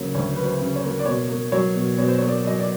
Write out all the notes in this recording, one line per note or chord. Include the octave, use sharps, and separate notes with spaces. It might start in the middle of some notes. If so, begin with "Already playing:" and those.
Already playing: D2 C#3 F#3 A#3 C#5
D2 C#5
F#3 B4
C5
C#3
C#5
A#3
D5
B2 C#5
A#3
F#3 C#5
B2
B2 C#5
C5
A#3 C#5
D5
F#3 D#5
D5